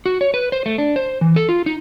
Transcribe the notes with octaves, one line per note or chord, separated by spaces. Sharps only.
F#4
C#5
B4
C5
A3
D4
C5
E3
A4
F4
D#4